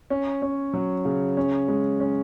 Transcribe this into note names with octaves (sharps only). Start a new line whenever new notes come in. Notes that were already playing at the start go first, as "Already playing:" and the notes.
C#4
C#4
F#3
C#3
C#4
G#3
C#4